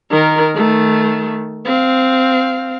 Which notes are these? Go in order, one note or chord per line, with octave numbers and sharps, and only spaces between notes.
D#3 A#4
D#3 A3
C4 F5